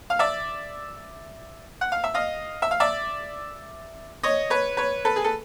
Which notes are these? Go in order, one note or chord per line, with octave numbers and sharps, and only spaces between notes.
F5
D5 E5
F#5
F5
E5
D#5 F5
E5
F5
D5 E5
C#5 D#5
B4 C#5
B4 C#5
A4 B4
G#4
A4